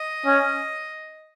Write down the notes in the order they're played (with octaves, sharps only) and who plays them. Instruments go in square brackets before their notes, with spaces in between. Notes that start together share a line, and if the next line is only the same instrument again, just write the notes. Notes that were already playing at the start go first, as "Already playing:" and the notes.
Already playing: [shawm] D#5
[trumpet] C#4